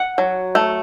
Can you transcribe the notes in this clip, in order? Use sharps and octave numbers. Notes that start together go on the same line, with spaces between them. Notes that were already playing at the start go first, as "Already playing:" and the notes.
Already playing: F#5
F#3
A3